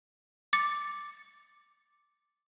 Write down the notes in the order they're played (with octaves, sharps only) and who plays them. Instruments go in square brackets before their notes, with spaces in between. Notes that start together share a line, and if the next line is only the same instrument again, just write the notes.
[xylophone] D6 A6 C#7